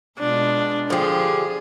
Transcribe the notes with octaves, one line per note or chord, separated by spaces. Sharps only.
B2 G#3 D4 F4
D3 F3 G4 G#4